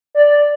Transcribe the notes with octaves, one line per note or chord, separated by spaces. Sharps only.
D5